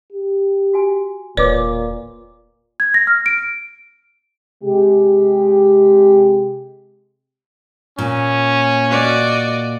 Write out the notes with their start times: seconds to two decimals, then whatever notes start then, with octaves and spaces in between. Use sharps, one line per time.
0.12 G4
0.73 F#4 G#5
1.37 E1 A#2 B4 C#5 D5 D6
2.80 G#6
2.94 A#6
3.07 F6
3.26 D7
4.64 C3 G#3 G4
7.99 A#2 C#4
8.90 F#4 D5 D#5